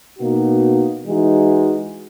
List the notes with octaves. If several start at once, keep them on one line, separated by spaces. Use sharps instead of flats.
B2 A#3 D#4 F#4
E3 G#3 D#4 F#4